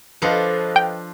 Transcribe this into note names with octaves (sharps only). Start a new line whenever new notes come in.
F3 D4 A4 B4 D#5 F5
G5